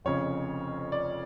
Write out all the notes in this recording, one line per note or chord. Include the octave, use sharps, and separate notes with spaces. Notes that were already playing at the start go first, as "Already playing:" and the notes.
F1 F2 C#3 C#5
D5